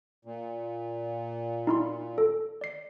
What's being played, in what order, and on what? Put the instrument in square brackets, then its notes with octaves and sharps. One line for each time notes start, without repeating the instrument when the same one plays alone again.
[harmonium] A#2
[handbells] D#4 E4 C6
A4
D5 C7